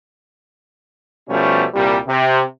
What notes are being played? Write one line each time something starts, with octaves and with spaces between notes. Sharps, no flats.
B2 F3 G3 A3 C#4
C2 A#2 G3
C3